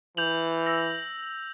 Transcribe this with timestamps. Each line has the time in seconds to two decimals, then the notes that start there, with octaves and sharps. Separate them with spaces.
0.17 E3 G6 F7 F#7
0.66 E6 A#6